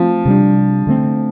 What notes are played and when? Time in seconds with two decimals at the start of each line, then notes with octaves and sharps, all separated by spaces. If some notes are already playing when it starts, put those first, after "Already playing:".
Already playing: F3 A3 C4
0.25 C3 G3 D4
0.87 D3 A3 C4